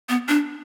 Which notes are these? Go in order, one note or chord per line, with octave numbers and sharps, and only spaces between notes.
B3
D4